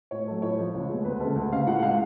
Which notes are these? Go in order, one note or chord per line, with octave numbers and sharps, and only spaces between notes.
A2 C#5
F#3 A3
A2 C#5
F3 G#3
C#2
B2 G#3
D2 B4
C#3 G#3 A4
D2
C#3 G#3 F5
A2 F#5
F#5
G#3 F5